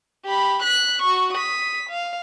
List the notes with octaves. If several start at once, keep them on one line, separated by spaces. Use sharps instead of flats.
G4 B5
F#6 B6
F#4 C#6
D#6 B6
F5